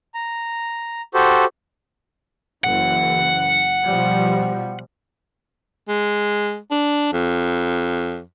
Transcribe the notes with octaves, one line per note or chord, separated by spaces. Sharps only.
A#5
F#4 G4 A4 C5
F#1 E3 F#5
B2 F3 G3
G#3
D4
F2